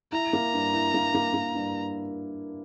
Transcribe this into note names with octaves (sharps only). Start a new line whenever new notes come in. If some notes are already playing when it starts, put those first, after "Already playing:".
E4 A#5
A#3
G2
E4
A#3
A#3
A#3
G2